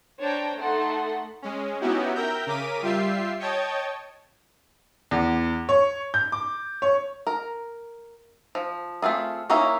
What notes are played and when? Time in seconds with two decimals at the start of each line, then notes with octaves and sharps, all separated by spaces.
0.20 D4 C5 C#5 G5 A#5
0.58 A3 D#4 A4 F#5 C6
1.42 G#3 C#4
1.81 B3 C#4 D#4 E4 F#4 G4
2.15 A#4 E5 G5 A#5 G6
2.47 C#3 A#4 D6 B6 D#7
2.82 G3 F4 G4 E5 C7
3.39 C#5 D#5 G5 A5 G#6
5.11 E2
5.69 C#5
6.14 G6
6.32 D6
6.82 C#5
7.27 A#4
8.55 F3
9.02 A3 C4 F4 G#4
9.50 A#3 C#4 D#4 E4 C#5